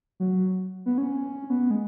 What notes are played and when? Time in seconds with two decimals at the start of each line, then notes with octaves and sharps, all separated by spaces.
0.20 F#3
0.86 B3
0.98 C#4
1.50 B3
1.71 G#3